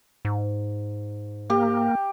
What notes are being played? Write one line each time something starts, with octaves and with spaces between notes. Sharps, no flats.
G#2
A#3 G4